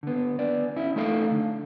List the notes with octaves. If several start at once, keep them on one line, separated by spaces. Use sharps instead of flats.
D3 B3
B3 D5
C#4 E4 E5
A3 D#4 A4 F5
D3